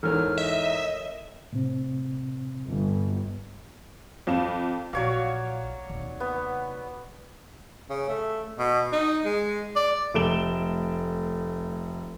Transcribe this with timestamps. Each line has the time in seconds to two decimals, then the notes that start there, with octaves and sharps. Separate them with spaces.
0.03 E2 G#2 E3 A4 A#4 C#5 F6
0.38 D#5 E5
1.53 A2 C3 C4
2.67 G1
4.27 F2 F5 E7
4.93 A#1 F#3 C#5 D5 F5
5.90 D#2 C3
6.20 B3
7.90 C#3
8.09 A3
8.59 B2
8.92 D#4
9.25 G#3
9.76 D5
10.14 F1 A3 D7 E7 G7